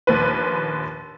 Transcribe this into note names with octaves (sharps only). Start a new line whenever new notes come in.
A#1 D#2 B4